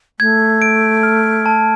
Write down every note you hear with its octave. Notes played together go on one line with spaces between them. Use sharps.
A3 G#6
D7
F6
A5